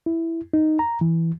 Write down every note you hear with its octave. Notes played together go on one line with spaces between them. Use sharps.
E4
D#4
A#5
E3